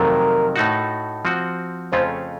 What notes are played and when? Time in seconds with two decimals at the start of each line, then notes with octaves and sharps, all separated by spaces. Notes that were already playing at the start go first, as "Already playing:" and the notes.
Already playing: F2 C3 D#3 F#3 A3 A#4
0.56 A2 A3 D#4 F#4
1.25 F3 C4 F#4
1.92 F2 C#3 A3 C#4 F4 C5